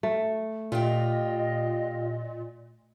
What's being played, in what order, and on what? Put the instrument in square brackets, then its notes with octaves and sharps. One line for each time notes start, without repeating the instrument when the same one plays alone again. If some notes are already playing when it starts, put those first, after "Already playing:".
[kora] A3
[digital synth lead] A#2 [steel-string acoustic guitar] F4 G4 [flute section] D#5